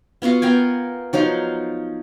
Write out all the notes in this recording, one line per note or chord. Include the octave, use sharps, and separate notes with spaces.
B3 F4 F#4 F5
B3 A#4 G5 G#5
F3 F#3 D#4 F4